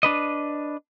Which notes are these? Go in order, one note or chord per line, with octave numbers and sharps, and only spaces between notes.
D4 B4 D#5